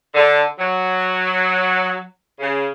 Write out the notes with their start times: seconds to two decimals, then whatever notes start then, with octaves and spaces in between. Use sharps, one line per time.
0.14 D3
0.59 F#3
2.39 C#3